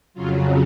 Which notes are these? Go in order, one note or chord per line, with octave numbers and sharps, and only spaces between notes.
F2 C#3 F#3 F4